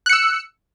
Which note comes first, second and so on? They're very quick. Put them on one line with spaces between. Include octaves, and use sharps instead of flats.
F#6 C#7 E6